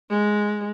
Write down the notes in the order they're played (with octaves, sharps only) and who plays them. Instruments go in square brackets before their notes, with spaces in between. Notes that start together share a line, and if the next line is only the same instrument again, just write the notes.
[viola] G#3